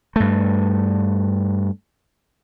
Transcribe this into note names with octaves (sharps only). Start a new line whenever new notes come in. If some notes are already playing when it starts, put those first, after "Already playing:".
G2 A3